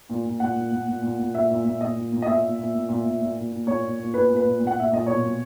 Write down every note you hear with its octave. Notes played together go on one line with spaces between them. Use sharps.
A#2
A#2
A#2 F#5
A#2
A#2
A#2
A#2
A#2
A#2 E5
A#2
A#2
A#2 D#5
A#2
A#2
D#5
A#2 E5
A#2
A#2
A#2
A#2
A#2
A#2
A#2
A#2
A#2 C#5
A#2
A#2
A#2 B4
A#2
B4
A#2
A#2
F#5
A#2 E5
A#2 D#5
B2 C#5
B2